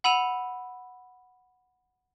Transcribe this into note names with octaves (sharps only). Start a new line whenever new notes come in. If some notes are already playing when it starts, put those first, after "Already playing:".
F#5 B5 E6 D#7 F7